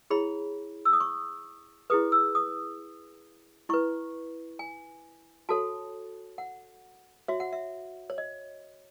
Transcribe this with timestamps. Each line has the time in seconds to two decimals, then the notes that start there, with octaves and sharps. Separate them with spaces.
0.10 E4 G#4 C#5 B5
0.85 E6
0.93 D#6
1.00 C#6
1.90 E4 G#4 B4 D#6
2.12 E6
2.35 D#6
3.69 E4 B4 C#6
4.59 G#5
5.49 F#4 A4 C#5 A5
6.38 F#5
7.28 F#4 C#5 E5
7.40 F#5
7.53 E5
8.10 C#5
8.18 D#5